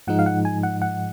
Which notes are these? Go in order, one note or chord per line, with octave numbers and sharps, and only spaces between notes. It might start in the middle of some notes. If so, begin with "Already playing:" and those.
G#2 F3 G#3 D#4 F#5
F5
F#5
G#5
F#5
F#5